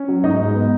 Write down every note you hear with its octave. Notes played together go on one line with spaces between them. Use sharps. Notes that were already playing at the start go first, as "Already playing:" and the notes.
Already playing: C#4 C#5
F#3
G#2 D#4 D#5
G#2
B3